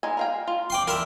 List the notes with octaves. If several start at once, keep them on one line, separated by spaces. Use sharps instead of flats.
G#3 D#4 G#5
A#4 F5 G5
F4
D5 G5 C6
G3 A#4 E5 C6